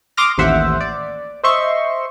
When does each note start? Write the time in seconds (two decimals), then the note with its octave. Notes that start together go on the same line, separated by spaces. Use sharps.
0.17 C6 D6 D#6 F6 A#6
0.38 A1 D#2 C5 E5 F#5
0.80 D5
1.44 C5 D#5 E5 C6 C#6